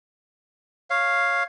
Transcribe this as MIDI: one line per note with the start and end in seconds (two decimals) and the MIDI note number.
0.90 1.43 73
0.90 1.43 77